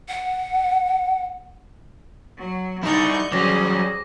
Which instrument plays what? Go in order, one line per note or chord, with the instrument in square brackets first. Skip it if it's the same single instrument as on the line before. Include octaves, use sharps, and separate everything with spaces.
[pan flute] F#5
[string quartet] F#3
[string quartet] D3 C#6 G6 [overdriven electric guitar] G3 E4 [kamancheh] D#4 D5
[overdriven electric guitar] F#3 G3 [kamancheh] C#4 [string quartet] G#4 C5 [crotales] D6 A#6